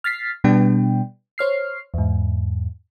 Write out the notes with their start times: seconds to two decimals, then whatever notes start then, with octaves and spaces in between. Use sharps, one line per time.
0.04 F6 A6 B6 C7
0.44 B2 G3 B3 D4 G5
1.38 C5 C#5 F6 C7
1.94 E2 G#2